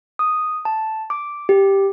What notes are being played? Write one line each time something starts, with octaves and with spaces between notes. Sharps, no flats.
D#6
A5
D6
G4